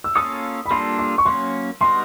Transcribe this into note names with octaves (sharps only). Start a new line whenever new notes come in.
E6
A#3 C#4 F4 A4 C#5 D#6
B5
G3 A#3 D4 F4 A4 C6
C6
C#6
F#3 A#3 C#4 C6
G3 B3 D#4 F#4 A#4 C6